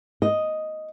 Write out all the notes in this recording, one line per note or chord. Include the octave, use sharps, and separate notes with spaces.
D#5